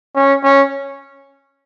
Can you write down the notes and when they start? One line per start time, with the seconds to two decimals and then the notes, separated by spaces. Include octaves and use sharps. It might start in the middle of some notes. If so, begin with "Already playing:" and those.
0.15 C#4
0.43 C#4